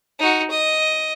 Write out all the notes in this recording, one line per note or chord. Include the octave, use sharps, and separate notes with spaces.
D#4 F#4
D#5